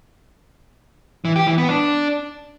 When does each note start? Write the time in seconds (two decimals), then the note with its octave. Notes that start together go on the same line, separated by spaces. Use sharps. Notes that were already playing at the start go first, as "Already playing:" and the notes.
1.25 E3
1.36 G4
1.47 E3
1.58 B3
1.69 D4